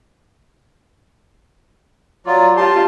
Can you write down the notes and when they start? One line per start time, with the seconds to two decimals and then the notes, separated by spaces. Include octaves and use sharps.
2.26 F#3 F4 D5
2.57 F4 G4 A5 C6